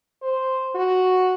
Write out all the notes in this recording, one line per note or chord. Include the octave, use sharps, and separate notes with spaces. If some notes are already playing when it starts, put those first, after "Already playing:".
C5
F#4